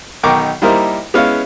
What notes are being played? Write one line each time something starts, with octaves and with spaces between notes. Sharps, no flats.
B1 D#3 A#4 G5 C#6 D6
G3 A#3 D#4 E4 A#4 C5
G#3 B3 C#4 E4 C#5 F5